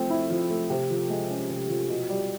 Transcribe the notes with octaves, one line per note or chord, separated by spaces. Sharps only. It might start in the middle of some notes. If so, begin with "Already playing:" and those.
Already playing: F3 A3 C4
E4
F3
A3
C3
F3
G#3
C#4
C3
F3
B2
G3